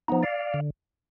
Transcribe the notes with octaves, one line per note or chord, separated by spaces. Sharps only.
F3 B3 D#4
D5 F5
D3